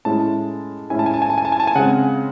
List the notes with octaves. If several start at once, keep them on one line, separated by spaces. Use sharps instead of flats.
A2 G#3 C#4 E4 A5
A2 G#3 C#4 E4 G#5
A5
G#5
A5
G#5
A5
G#5
A5
G#5
A5
G#5
C#3 G#3 C4 F#5